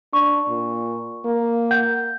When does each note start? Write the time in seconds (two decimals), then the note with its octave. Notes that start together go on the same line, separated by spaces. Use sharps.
0.13 D4 C#6
0.49 A#2
1.25 A#3
1.71 F#5 G6